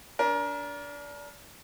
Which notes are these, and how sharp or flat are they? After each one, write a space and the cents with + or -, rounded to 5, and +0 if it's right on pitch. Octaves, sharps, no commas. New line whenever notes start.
D4 -25 A#4 +25